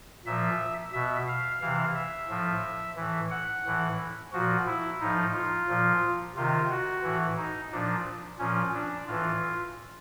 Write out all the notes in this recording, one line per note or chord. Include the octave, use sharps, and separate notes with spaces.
A#2 F3 E5
B2 E5
F5
C3 E3 F5
E5
A2 F3
A2 E3
F#5
A2 E3
A#2 F3 F#4
E4
A2 F3 D#4
F4
A#2 F3
C3 D#3 F4
F#4
A2 E3
D#4
A#2 F3 D4
A#2 F3 C#4
D4
A2 E3 F4